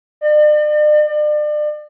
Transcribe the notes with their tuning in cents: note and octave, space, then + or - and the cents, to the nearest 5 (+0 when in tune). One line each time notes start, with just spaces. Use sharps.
D5 +45
D5 +35